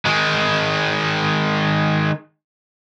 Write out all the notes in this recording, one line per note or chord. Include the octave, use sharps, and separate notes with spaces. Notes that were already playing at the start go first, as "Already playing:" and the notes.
D#3 G#3